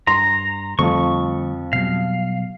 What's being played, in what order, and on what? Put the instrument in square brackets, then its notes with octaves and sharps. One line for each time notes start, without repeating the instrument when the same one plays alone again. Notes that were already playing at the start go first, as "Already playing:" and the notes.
[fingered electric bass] G2 [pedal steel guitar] A#5 [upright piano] C6
[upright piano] F2 F3 [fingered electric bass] D3 G3 A3 [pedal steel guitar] C#6
[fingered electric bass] B2 F#3 G3 [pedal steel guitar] F5